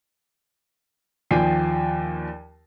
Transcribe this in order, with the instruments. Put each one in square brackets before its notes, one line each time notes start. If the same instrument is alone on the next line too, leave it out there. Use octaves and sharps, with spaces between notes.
[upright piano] D#2 F3 D5 G5 G#5 C7